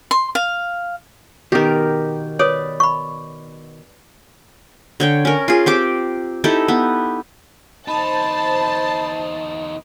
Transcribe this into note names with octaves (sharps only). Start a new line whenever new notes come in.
C6
F5
B2 D#3 G4 A#4
B4 C#5 D5 D#6
B5 C#6
D3 C#5 G5
C#4 A#4
F4 G#4
C4 G4 D6
D#4 E4 G4 A4
B3
E2 D#4 C5 A5 B5